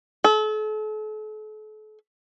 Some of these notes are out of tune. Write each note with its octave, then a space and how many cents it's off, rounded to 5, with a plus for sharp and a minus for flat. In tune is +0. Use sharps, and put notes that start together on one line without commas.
A4 -40